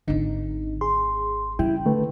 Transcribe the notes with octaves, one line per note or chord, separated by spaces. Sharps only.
G#1 D3 C4 D#4
G#4 C6
C#3 G3 E4 G5
D3 A3 B4